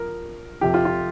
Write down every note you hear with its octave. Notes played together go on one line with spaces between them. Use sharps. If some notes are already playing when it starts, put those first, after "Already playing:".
Already playing: F3 A#4
F2 C3 F3 G4
F4
F4